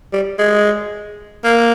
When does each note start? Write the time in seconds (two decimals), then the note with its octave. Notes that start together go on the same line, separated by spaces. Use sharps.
0.13 G3
0.39 G#3
1.44 A#3